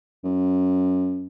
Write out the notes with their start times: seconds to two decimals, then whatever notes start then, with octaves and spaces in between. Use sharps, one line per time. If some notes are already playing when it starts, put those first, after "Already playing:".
0.24 F#2